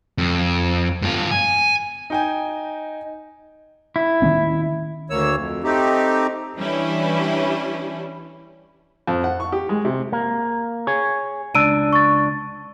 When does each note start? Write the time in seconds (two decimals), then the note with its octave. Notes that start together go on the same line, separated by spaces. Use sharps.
0.18 F2
1.02 G2 F4
1.31 G#5
2.10 D#4 G5 G#5
3.96 E4
4.22 D#3 A#3 C#4
5.10 D2 A#3 C#5 E6
5.36 F2
5.64 A3 C4 D#4 G4
6.57 E3 G3 C#4 D4 E4
9.07 F2
9.24 F#5
9.40 C#6
9.52 G4
9.69 G#3
9.85 C3
10.12 A#3
10.87 G#4 C#5
11.55 C#2 D4 E6 D7 D#7
11.93 C#6 A6